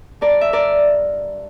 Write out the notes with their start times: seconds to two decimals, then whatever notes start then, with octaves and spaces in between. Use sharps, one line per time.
0.21 G2 A#4 D5
0.41 E5
0.53 A#4 D5